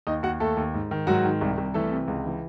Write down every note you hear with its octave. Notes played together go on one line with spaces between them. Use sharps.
D#2 D#4 D#5
D#2 F#4 F#5
D#2 A3 A4
D#2
G#2
D#3
G#2 F#3 F#4
D#3
C2
C2
E3 A3 A4
C3
C#2
E3